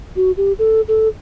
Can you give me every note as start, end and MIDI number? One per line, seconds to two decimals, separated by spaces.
0.16 0.32 66
0.37 0.53 67
0.59 0.81 69
0.88 1.08 69